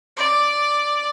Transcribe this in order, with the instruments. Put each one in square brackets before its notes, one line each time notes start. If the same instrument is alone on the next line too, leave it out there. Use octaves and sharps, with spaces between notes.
[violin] D5